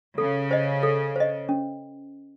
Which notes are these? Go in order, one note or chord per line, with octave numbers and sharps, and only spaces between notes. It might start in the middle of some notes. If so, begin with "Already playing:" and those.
C#3 A4
C5 D#5
A4
C5 D#5
C#4